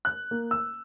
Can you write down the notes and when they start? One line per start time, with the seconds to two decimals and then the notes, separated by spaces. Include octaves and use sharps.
0.05 F#6
0.31 A#3
0.51 E6